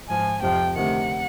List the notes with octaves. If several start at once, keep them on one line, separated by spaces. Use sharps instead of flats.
G#2 F3 G#5
F2 C3 F3 G5
D2 C3 D#3 F#5